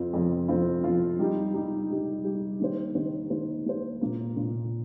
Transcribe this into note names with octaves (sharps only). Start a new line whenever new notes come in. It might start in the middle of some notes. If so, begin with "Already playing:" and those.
Already playing: F2 F3 C4 F4
F2 F3 C4 F4
F2 F3 C4 F4
F2 F3 C4 F4
G3 D#4 G4
G3 D#4 G4
G3 D#4 G4
G3 D#4 G4
D#3 A#3 G4 C5
D#3 A#3 G4 C5
D#3 A#3 G4 C5
D#3 A#3 G4 C5
A#2 A#3 F4
A#2 A#3 F4